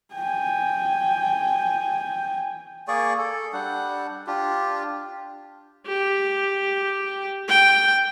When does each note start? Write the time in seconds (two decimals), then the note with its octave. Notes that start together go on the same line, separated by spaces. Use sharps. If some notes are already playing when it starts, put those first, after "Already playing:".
0.14 G5 G#5
2.88 A#3 G#4 D5 C#6
3.18 A4
3.53 G3 D4 F#5
4.27 D4 F4 G4
5.87 G4
7.48 G5